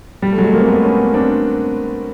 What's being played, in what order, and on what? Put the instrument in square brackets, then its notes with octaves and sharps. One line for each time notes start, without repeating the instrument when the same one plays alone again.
[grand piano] G3
A3
F#3 G#3
A3
G#3 A#3
C4
A3 B3
B3 C#4
C4 D4